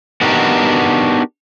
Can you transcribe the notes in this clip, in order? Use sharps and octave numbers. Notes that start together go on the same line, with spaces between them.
B3 D4 D#4 F#4 G4 A#4